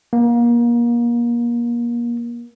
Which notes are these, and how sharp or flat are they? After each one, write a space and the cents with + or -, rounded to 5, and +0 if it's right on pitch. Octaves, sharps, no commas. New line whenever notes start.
A#3 +30